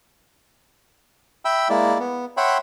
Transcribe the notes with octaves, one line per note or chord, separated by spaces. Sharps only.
E5 G5 B5 E6
G#3 A#3 E4 D5
B3
C#5 E5 F#5 G5 B5 C6